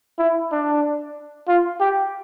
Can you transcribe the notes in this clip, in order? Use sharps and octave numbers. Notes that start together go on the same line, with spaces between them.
E4
D4
F4
G4